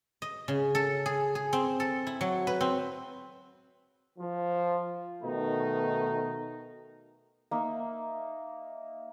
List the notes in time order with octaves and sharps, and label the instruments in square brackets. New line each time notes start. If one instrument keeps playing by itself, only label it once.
[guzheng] D#5
C#3
A4
G#4
G#4
C4
A4
E4
F#3
B4
C4
[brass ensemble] F3
B2 D#3 A3 D#4
[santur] A#3 D#4 E5 F5